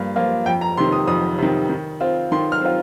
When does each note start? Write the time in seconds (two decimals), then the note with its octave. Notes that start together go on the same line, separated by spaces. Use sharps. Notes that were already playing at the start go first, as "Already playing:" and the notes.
Already playing: G2 F3 A#3 F4
0.16 F3 A#3 F4
0.46 F2 G5
0.61 A#5
0.77 C3 D#3 C6
0.92 D#6
1.08 F2 D#6
1.38 C3 D#3
1.69 D#3
2.00 C4 F4
2.32 D#3 C6
2.52 F6
2.62 C4 F4